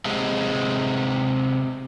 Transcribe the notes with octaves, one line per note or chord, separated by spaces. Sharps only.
C3 G#3